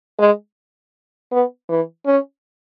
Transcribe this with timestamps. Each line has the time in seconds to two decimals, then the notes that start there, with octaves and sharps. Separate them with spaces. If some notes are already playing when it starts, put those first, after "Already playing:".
0.19 G#3
1.31 B3
1.69 E3
2.06 C#4